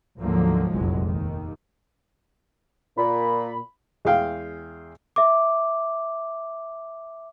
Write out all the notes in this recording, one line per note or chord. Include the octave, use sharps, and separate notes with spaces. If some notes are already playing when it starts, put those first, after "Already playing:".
D2 G#2 D3 F3 F#3 A#3
F1 A#1 E2 F#3 G#3
D#2 D#3
A#2 B5
E2 G#3 G#4 F5 G5
E5 D6